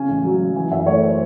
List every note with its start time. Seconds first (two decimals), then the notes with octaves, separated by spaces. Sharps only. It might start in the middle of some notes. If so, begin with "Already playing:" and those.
Already playing: C#3 C#4 G#5
0.09 A1
0.24 F#3
0.40 C#4
0.56 E3 G#5
0.71 F#2 E5
0.86 A3 C#5
1.02 C5